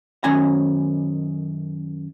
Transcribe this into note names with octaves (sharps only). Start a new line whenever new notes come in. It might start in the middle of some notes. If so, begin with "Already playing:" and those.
F#2 D#3 C#4 G#5 A#5